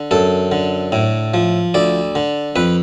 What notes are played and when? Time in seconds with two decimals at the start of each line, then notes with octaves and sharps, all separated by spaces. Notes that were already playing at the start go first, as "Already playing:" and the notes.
Already playing: D3
0.11 F#2 A4
0.52 D3
0.92 A2
1.34 F3
1.74 D2 D5
2.15 D3
2.56 F2 B4